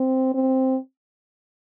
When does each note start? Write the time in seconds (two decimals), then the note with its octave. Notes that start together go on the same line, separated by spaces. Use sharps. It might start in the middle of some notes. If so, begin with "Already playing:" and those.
Already playing: C4
0.35 C4